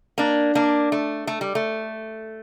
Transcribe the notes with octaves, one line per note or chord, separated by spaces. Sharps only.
A#3 D4
A#3 D4
A3
A3
G3
A3